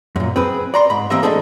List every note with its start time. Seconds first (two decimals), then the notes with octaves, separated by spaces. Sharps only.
0.16 F#2 A#2
0.36 C4 G#4 B4
0.74 D5 A#5 C6
0.90 G#2 B5
1.10 E3 A#3 C4 G4 D#5 E5
1.23 A2 G#3 C4 D4 G#4 A4